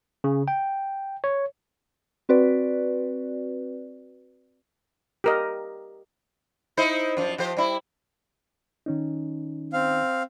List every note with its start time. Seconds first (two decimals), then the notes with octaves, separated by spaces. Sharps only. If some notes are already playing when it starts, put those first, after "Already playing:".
0.24 C#3
0.48 G5
1.24 C#5
2.29 C4 F#4 B4 D5
5.24 G4 A#4 D#5
6.77 D#4 E4 C5
7.17 F#2 F3
7.38 F3 G4 C5
7.57 G3 E4
8.86 D#3 C#4 D#4
9.73 C4 F5